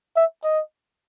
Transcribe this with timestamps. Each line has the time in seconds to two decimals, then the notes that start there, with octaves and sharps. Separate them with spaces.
0.16 E5
0.44 D#5